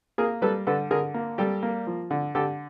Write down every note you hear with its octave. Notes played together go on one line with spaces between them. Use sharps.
A#3 G#4 A#4
G3 A4 B4
D3 A4 B4
D3 G#4 A#4
A#3
G3 G4 A4
A#3
F3
D3
D3 G4 A4